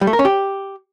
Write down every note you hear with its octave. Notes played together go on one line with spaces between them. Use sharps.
G3
A3
A#4
C#4
G4